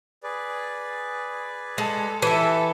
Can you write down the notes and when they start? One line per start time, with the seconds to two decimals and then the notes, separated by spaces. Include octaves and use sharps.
0.24 G#4 B4 D5
1.78 G#3 A4
2.22 E3 E4 G4 A4 E5